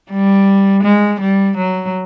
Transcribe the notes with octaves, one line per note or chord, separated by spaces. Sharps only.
G3
G#3
G3
F#3